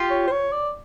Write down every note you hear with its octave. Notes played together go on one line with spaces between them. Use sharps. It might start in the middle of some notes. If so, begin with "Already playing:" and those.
Already playing: F4 G4
C#5
C5
C#5
D5